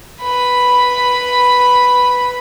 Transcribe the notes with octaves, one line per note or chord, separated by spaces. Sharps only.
B4 B5